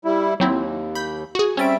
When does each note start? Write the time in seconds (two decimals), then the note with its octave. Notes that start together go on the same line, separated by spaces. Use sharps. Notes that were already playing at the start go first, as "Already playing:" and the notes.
0.05 G3 E4
0.40 D#2 F#3 C4 E4
0.95 B5 G6
1.35 F#4 G#4
1.57 G3 C4 C#4 E5 A6 D7